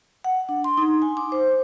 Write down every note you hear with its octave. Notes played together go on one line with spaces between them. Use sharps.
F#5
D4
C6
D#4
G#5
D6
C5